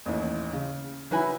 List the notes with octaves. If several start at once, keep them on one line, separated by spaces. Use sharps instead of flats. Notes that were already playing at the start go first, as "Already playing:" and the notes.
A1 D#2 E3
C#3
F#3 D#4 E4 B4 G#5